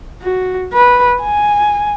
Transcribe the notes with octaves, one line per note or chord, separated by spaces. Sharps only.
F#4
B4
G#5